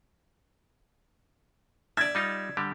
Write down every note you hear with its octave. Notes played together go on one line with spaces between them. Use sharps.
D5 E5 G#6
G3 D#4 F4
D3 G3 G4